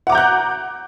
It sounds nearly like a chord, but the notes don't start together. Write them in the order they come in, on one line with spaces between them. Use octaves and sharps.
F#5 D6 A#5 G6 F#6